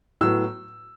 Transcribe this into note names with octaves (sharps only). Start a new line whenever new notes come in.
A2 F#3 B3 E6